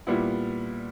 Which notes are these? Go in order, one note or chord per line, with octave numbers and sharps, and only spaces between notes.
A#2 G3 B3 E4